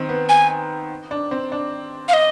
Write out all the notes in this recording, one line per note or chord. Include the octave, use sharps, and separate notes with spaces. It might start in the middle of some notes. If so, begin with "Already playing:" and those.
Already playing: D#3 C4
B3
G#5
D4
C4
D4
F5
D#5